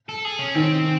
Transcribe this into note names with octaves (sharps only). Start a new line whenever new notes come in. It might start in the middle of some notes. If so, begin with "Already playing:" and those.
A4
G#4
C#4
D#3 C4